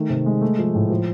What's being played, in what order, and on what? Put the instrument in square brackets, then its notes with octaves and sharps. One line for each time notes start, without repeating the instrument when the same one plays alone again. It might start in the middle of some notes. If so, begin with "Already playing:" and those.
Already playing: [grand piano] D#3 A3
C3
G#3
A3
F3
A2
F3